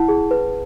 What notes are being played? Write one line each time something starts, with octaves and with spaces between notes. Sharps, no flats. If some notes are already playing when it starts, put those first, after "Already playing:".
Already playing: E4 F#5 A5
G#4
B4